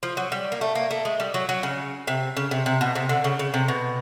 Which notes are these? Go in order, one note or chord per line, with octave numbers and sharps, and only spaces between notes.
F3
F#3
G3
A#3
A3
A#3
A3
G#3
G3
F#3
F#3
C#3
C3
C#3
C3
C3
B2
C3
D3
C#3
C#3
C3
B2